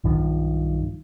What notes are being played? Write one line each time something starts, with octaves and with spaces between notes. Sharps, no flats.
B1 G2 D#3 F3